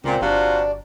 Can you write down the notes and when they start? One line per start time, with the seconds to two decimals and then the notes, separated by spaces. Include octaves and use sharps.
0.04 C#2 A#2 C4
0.21 G1 C3 D4 F4 F#4